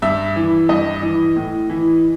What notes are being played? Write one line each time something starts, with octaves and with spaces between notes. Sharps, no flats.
G2 E5
E3
G2 D#5
E3
A2
E3